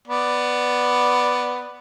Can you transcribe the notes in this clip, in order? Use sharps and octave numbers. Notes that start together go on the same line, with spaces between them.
B3 D5